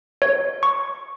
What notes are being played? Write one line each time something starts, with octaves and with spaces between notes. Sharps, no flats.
C#5
C#6